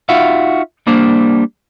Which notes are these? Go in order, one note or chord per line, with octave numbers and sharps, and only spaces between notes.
D#4 F4 F#4 E5 F5
G3 A#3 D4 C5